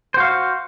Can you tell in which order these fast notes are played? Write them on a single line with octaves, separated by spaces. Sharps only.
C5 F#4 F5